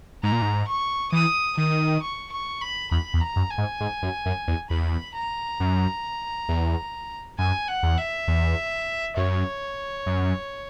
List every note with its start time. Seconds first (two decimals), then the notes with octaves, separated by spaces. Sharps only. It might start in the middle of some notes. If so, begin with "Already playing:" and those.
0.23 G#2 A#5
0.32 A#2
0.42 G#2
0.68 C#6
1.12 E3 D#6
1.57 D#3 D#6
2.02 C#6
2.32 C#6
2.61 B5
2.91 E2 B5
3.14 E2
3.21 A#5
3.36 F#2
3.51 G#5
3.58 G#2
3.80 G#2
4.02 F#2
4.26 F#2
4.48 E2
4.70 E2 B5
5.15 A#5
5.60 F#2
6.49 E2
7.38 F#2 G#5
7.68 F#5
7.83 E2
7.98 E5
8.28 E2
9.17 F#2 C#5
10.06 F#2